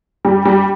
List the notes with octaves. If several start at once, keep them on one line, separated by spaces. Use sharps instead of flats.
G3
G3